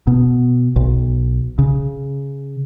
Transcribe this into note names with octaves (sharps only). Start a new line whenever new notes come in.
B2
B1
C#3